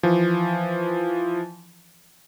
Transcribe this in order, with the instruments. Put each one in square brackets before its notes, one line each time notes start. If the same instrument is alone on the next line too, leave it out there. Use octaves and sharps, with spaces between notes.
[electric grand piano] E3 F3